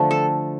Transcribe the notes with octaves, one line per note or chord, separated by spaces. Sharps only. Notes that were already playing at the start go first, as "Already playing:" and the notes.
Already playing: D3 F3 A3
A4